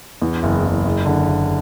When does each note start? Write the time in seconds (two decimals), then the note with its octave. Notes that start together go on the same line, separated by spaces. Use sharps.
0.22 E2
0.43 F#1
0.64 F#1
0.85 F#1
1.06 D3
1.28 F#1